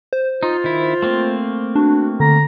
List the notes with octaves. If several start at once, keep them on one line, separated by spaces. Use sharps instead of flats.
C5
D#4 F4
D#3 E4
A3 A#3 C4
D4 F#4
D3 A#5